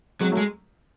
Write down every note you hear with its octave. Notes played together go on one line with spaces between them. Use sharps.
F#3 G#3 C4
F#3 A3
G#3